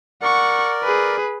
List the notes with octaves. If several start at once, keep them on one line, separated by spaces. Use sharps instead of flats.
A#4 D5 F#5 C#6
G#4 B4